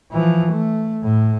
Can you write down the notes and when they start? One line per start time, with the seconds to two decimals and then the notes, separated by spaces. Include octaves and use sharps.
0.11 E3 F3
0.52 A3
1.03 A2